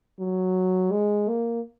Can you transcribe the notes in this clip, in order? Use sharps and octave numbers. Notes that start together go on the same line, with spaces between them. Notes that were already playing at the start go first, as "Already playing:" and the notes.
F#3
G#3
A#3